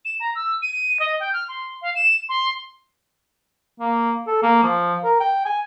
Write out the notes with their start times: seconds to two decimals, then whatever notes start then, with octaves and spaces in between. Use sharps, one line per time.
0.05 E7
0.20 A#5
0.35 E6
0.62 D#7
1.00 D#5
1.20 G5
1.33 F6
1.48 C6
1.82 F5
1.95 E7
2.29 C6
3.80 A#3
4.27 A4
4.43 A#3
4.63 F3
5.04 A#4
5.20 G5
5.45 G#5